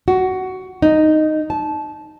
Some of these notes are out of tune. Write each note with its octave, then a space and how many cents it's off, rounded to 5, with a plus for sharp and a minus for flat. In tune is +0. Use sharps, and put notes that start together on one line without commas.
F#4 +15
D#4 -5
A5 -20